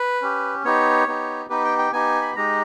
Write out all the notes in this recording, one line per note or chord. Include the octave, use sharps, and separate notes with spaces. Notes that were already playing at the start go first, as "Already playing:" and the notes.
Already playing: B4
C#4 G4
B3 D#4 G4 C#5
B3 D#4 G4
B3 D#4 G4 B4
G5
G5
B3 D#4 G4 G#5
B5
G#3 D#4 G4 A#5